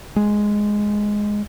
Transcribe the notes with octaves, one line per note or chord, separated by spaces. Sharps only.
G#3